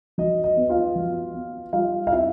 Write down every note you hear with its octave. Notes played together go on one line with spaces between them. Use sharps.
F#3 D#5
D#5
B3
F4 F5
F#3
B3
G3 F4 F5
F5
C4 E4 E5